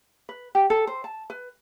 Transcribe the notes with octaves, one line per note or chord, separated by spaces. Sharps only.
B4
G4
A4
C5
A5
B4